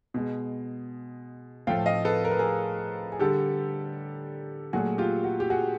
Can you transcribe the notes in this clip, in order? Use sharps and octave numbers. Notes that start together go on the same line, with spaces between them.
B2 G#3
A2 F3 A3 F5 G5
D#5 F5
A4 B4
A#4
B4
G#4 A#4
G#4
D3 G3 G4 A4
A#2 F#3 A3 F#4 G#4
F4 G4
F#4
G4
F#4 G#4